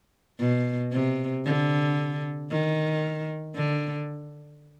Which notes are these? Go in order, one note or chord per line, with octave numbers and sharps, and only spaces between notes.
B2
C3
D3
D#3
D3